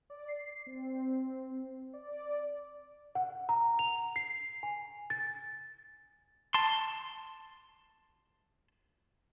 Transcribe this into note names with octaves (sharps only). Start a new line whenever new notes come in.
D5
C7
C4
D5
F#5
A#5
F7
C7
G#5
A6
A5 C6